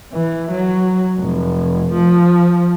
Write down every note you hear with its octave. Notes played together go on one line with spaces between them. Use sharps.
E3
F#3
F1
F3